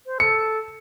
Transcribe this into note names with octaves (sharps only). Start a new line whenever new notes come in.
C5
A4 C#7